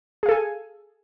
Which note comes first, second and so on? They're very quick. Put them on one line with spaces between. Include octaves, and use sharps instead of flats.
G#4 F5 A4 G#5